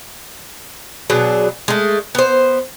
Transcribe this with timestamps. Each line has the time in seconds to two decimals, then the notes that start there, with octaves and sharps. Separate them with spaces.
1.10 B2 F#3 D4 G#4
1.68 G#3 A3
2.15 B3 C5